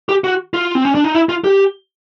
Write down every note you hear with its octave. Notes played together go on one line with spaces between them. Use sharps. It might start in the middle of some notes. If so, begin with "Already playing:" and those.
G4
F#4
F4
C4
C#4
D4
D#4
E4
F4
G4